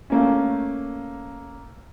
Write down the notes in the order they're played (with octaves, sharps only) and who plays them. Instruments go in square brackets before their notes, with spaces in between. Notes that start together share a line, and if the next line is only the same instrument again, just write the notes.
[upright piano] A3 A#3 C#4